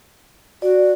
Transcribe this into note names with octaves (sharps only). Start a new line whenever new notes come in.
F#4 D5